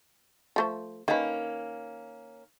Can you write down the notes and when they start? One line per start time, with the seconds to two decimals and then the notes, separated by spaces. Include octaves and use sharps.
0.56 F3 A3 C5
1.08 D#3 A#3 C#4 B4